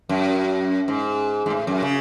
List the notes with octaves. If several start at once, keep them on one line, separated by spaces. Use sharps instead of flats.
F#2
G#2
G#2
A2
F#2
C#3